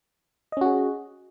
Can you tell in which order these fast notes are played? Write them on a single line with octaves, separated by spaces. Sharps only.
D#5 C#4 F#4 G#4